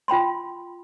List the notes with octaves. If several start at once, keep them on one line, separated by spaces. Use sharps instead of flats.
F4 G5 B5 C6